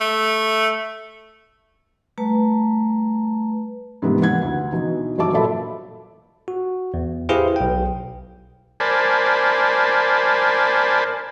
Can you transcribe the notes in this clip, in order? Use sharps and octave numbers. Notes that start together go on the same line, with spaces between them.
A3
G3 A3 B4 A5 A#5
G#2 C3 E3 G3 A#3 B3
E3 F#5 G#6
D2 F#5
B2 E3 D#4
G1 E3 F#3 E5 A5 D6
A#2 F#3 A4 E5 A5 B5
F#4
E2
E4 G4 G#4 B4 C5 F5
B1 G5
A#4 C5 D5 G#5 A5 B5